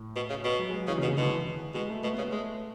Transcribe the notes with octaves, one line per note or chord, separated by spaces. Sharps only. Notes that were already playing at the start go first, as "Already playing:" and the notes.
Already playing: A2
B2
C#3
B2
F#3
G#3
F#3
C#3 E3
C#3
B2
C#3
B2 D3
E3
B2 G#3
A3
B2 A3
B3
C#3
B3
G#3 A3